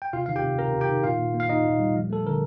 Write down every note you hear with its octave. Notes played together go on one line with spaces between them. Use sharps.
G5
C3 F4 F5
D#3 F5
G4 G5
C3
C3 A#4 A#5
C3
G4 G5
D#3
A#2 F4 F5
A#2
A#3
F5
A#2 D#4 D#5
A#2
G3
F3
A3 A4
D3 A#4